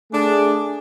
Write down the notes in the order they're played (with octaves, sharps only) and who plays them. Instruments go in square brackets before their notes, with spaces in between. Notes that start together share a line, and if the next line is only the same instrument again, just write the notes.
[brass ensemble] A3 G#4 [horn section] D4